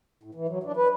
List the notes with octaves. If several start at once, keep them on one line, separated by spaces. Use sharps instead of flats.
A2
E3
F#3
D4
B4